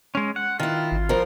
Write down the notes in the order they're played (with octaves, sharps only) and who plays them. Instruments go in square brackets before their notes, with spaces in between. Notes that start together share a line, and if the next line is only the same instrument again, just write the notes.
[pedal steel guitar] G#3 C#4
F#5
[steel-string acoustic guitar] D#3 E4 [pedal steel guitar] F4
[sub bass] G#1
[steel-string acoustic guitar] F3 A#4